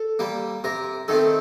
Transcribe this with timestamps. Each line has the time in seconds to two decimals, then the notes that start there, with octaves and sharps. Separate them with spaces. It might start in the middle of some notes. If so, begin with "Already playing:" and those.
Already playing: A4
0.19 G3 A#3
0.64 C3 A#4
1.08 D#3 A3 C4 A4